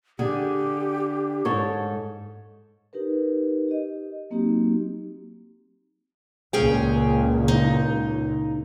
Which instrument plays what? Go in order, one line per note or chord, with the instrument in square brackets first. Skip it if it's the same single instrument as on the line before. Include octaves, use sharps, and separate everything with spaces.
[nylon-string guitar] D3 G#4 [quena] G4
[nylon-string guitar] G#2 A4 C#5
[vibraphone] D#4 G4 A#4 B4
G4 D#5
F#3 A#3 C4 D#4 F#4 G4
[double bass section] C#2 A#2 [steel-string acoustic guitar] C#4 G#4 G5
[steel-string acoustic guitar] D#4